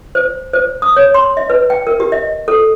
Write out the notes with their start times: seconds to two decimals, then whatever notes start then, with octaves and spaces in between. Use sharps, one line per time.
0.15 C5
0.53 C5
0.82 D#6
0.96 C#5
1.14 C6
1.37 D#5
1.50 B4
1.70 G5
1.87 A#4
2.00 G4
2.12 D#5
2.48 A4